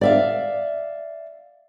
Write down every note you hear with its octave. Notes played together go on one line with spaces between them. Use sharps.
D5 E5 F5